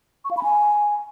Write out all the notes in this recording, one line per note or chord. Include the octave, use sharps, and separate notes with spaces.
C#6
F5
B5
G#5